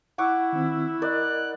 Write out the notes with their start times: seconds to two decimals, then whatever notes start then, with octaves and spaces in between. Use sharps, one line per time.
0.18 E4 F#5 C#6 D6
0.53 D#3 C4
1.02 A#4 D5 D#5 F#6